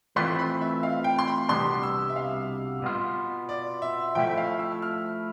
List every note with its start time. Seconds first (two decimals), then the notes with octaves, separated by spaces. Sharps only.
0.16 E3 A3 C4 F4 B4 C6
0.39 B5
0.61 E5
0.83 F5
1.04 G5
1.19 C6
1.27 B5
1.49 C2 B2 G3 B3 D4 C6
1.83 E6
2.10 E5
2.16 F5
2.82 B2 B3 F4
3.49 D5
3.82 E5
4.15 F3 A3 E4 G5
4.30 E5
4.37 F5
4.59 E6
4.72 E6
4.82 F6